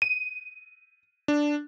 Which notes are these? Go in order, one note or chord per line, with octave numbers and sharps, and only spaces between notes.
D#7
D4